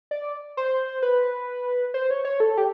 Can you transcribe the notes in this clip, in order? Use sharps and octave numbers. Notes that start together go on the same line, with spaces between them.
D5
C5
B4
C5
C#5
C#5
A4
G4